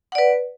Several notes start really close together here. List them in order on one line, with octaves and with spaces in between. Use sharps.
F#5 D5 B4